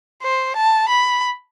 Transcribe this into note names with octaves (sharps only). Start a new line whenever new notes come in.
C5
A5
B5